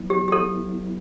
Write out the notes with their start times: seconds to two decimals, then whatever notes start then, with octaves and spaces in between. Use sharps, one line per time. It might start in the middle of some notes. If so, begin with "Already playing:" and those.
Already playing: F#3 B3 E4
0.10 G4
0.28 G4
0.32 A4